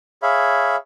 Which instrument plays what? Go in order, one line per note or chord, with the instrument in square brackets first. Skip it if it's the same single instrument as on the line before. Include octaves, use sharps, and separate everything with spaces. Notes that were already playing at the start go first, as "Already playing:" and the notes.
[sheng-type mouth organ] G#4 C#5 E5 F5 B5